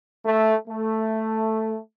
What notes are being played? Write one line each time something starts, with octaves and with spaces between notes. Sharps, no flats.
A3
A3